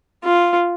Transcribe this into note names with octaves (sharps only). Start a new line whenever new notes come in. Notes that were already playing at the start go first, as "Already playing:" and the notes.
F4